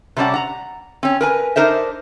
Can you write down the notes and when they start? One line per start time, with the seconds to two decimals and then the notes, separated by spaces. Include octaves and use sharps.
0.16 C3 G3 C#4 D4 D5 F#5
0.34 F#5 A#5
1.03 C4 C#4
1.21 A#4 B4 G#5
1.56 D4 D#4 A#4 C5 E5